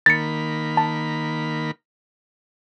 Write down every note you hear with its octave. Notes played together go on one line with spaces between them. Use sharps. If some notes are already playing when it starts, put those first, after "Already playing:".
D#3 A#3 B5 A6 C#7
A5